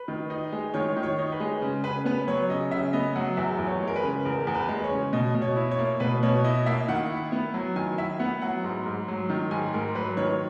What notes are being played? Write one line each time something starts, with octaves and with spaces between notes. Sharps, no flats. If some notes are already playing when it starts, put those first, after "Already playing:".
Already playing: B4
D#3
D#4
G#3
D#3 C#5
D#3
C#5
D#4
B4
G#3
C#3
C#3 B4
B3 B4
F#3 C#5
C#3 D#5
C#3 E5
B3 D#5
F#3 F#5
E2 E5
E2
C#5
G#3
A#4
B4
C#3
E2 A#4
E2
B4
G#3
C#5
C#3
B2 D#5
B2
C#5
E4
C#5
A#3
B2 B4
B2 C#5
E4 D#5
A#3 E5
D#3 F#5
E4
B3
F#3
D#3 G#5
E4 E5
B3 F#5
F#3 F#5
G#2
G#2
F#3
D#3
G#2 G#5
G#2 A#4
F#3 B4
D#3 C#5